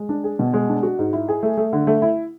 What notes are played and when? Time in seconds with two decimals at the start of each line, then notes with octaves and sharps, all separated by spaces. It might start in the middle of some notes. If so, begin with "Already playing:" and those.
Already playing: G#3
0.09 D4
0.24 G#4
0.39 B2
0.54 G#3
0.69 D4
0.83 F#4
0.99 G#2
1.13 E4
1.28 G#4
1.43 A3
1.57 A3
1.73 D3
1.87 A3
2.02 E4